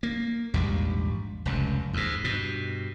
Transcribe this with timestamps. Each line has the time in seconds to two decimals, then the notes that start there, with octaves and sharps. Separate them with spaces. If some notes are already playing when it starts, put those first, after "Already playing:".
0.03 A#3
0.54 A#1 E2 G#2 G3
1.45 F1 C#2 F#2
1.93 D#2 G#2
2.24 G2 B2